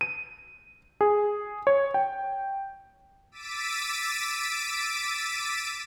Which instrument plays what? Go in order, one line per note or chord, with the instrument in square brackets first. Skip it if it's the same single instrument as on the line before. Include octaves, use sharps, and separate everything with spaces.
[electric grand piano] D#7
G#4
C#5
G5
[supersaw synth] D6 E6 A6 B6 D7 D#7